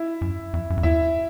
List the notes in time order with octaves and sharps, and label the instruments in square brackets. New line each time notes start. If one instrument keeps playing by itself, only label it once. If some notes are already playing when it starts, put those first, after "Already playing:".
Already playing: [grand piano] E4 E5
[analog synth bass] F#2
F2
F#2
F2
[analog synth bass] E2 [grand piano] E4 E5